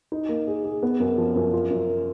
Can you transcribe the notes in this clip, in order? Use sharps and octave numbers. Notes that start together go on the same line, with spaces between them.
D#4
A#3
G#4
G#4
B3
F#2
F3
F#2
F4
F#2